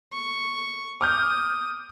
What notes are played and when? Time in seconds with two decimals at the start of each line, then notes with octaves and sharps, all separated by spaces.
0.13 C#6
1.01 D6 D#6 F6 G6